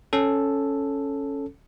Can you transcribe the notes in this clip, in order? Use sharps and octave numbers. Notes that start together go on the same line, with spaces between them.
C#4 A4